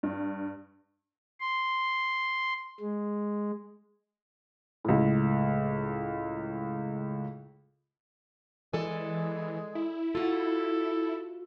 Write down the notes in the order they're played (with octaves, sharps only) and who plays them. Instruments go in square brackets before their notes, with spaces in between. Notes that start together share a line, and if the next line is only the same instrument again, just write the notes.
[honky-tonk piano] G2
[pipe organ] C6
G#3
[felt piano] C#2 A2
[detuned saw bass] E3 [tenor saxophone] G#3 [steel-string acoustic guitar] A4 D5 G#5
[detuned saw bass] E4
[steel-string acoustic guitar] F4 F#4 [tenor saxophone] A4